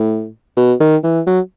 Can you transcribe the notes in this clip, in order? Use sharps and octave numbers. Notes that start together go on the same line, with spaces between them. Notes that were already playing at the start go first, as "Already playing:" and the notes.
Already playing: A2
B2
D#3
E3
F#3